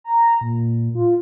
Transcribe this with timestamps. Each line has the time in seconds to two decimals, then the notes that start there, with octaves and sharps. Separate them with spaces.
0.04 A#5
0.41 A#2
0.95 F4